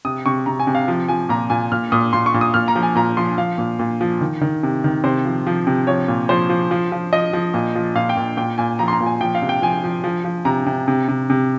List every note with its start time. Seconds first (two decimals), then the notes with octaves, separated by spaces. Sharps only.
0.05 C3 D#6
0.26 C3 C#6
0.46 C3 A#5
0.60 G#5
0.67 C3
0.75 F5
0.88 F3
1.08 F3 G#5
1.29 A#2 A#5
1.50 A#2 G#5
1.72 A#2 F6
1.92 A#2 D#6
2.13 A#2 C6
2.26 C#6
2.34 A#2
2.41 D#6
2.54 A#2 F6
2.68 A#5
2.76 F3
2.83 G#5
2.96 A#2 A#5
3.17 F3 C6
3.38 F3 F5
3.58 A#2
3.79 A#2
4.01 F3
4.21 D#3
4.41 D#3
4.63 C3
4.84 D#3
5.04 C3 C5
5.25 F3
5.47 F3
5.67 C3
5.87 F3 C#5
6.08 A#2
6.29 F3 C5
6.50 F3
6.71 F3
6.92 F3
7.13 F3 D#5
7.33 F3
7.54 A#2
7.75 F3
7.95 A#2 F5
8.09 G5
8.17 A#2
8.37 A#2 G5
8.58 A#2 G#5
8.79 F3 A#5
8.88 C6
8.93 A#5
9.01 A#2
9.06 G#5
9.21 F3 G5
9.35 F5
9.42 C3
9.49 G5
9.62 F3 G#5
9.84 F3
10.04 F3
10.24 F3
10.45 C3 A#5
10.66 C3
10.88 C3
11.08 C3
11.30 C3